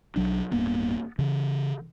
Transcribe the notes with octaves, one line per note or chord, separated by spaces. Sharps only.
B1 F#3 D4
D1 G2 A#3 B3
C#3 E3